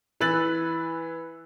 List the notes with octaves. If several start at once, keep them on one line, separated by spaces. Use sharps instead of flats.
E3 B4 E6 F#6 A6 F#7